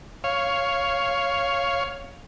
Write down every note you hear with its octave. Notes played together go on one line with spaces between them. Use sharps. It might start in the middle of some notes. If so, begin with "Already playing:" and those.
C#5 F5